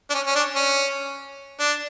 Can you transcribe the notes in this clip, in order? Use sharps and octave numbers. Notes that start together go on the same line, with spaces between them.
D4
C#4
C#4
D4
C#4
D4